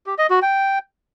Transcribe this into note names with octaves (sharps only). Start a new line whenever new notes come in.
G4
D#5
F#4
G5